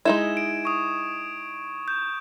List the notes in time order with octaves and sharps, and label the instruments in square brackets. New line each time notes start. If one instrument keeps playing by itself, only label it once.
[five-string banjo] G#3 D#4 E4 [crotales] G#6 E7
[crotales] D7
C#6 D#6
G6